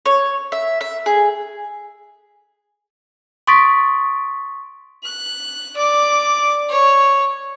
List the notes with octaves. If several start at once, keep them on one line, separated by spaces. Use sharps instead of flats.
C#5
E5
E5
G#4
C6 C#6 D#6 A6 B6 D7
F#6
D5 D6
C#5